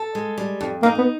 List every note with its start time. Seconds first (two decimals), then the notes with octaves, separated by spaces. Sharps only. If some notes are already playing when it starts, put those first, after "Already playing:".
Already playing: A4
0.15 G#3
0.38 G3
0.61 F2
0.83 A#3 D#4
0.98 B3